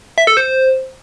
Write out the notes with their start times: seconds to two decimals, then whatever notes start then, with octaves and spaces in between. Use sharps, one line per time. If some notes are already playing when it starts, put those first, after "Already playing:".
0.18 E5
0.27 A4
0.37 C5